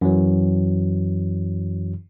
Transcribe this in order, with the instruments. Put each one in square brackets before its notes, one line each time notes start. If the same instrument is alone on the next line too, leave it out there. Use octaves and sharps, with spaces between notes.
[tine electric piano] F#2 E3 F#3